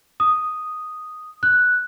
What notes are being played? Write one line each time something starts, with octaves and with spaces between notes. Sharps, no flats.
D#6
F#6